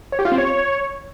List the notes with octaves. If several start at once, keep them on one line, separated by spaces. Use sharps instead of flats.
C#5
G4
F4
C4
C#5